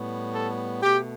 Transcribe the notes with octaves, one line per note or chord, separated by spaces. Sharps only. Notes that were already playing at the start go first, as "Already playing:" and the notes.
Already playing: A2 G3 B3
A4
B2 A3 G4